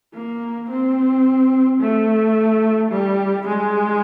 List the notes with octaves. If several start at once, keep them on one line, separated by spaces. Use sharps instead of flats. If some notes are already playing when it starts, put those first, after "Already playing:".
A#3
C4
A3
G3
G#3